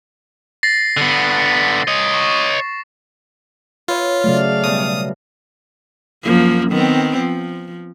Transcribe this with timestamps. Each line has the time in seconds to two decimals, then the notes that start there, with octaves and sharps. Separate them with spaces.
0.63 A6 A#6 C7
0.97 D3 B3
1.88 C#5 D#5
2.14 C#6
3.88 F4 B4 C#5 E5
4.24 C#3 F#3 A3 D5 F5
4.64 B2 G3 D#6
6.23 F#2 F3 A#3
6.71 D#3 B3 C4
7.18 F3